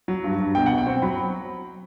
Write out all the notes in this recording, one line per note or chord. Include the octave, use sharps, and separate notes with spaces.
F#3
G2
G2
B2 G5
B2 F#5
G5
C4
F#3 B5